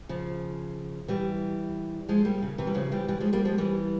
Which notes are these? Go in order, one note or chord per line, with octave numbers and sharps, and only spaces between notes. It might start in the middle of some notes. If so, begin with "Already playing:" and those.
C#3 F3
E3 G3
F3 G#3
G3 A#3
C#3
C3 E3
G3
C#3 F3
E3 G3
E3 G3
F3 G#3
G3 A#3
F3 G#3
E3 G3